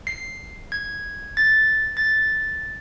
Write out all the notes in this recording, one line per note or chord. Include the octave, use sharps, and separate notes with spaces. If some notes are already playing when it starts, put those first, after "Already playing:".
C7
G#6
A6
A6